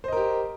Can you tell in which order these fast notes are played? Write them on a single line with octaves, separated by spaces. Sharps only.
C5 D#5 A#4 G4